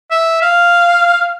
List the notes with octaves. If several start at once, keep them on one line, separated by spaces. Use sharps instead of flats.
E5
F5